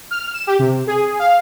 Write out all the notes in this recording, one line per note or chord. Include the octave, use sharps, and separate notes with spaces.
F6
E7
G4
C3
G#4
F5